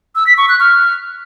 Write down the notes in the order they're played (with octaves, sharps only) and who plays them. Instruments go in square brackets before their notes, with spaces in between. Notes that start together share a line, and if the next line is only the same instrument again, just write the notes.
[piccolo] E6
B6
C#6
F#6
F6